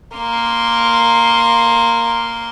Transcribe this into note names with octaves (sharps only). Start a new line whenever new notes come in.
A#3 C6